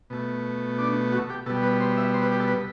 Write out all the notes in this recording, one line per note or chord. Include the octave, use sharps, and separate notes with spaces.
B2 A3
D4
F#4
G4
B2 G3 A4
B4
C5
E5
C5
B4
G4
A4
B4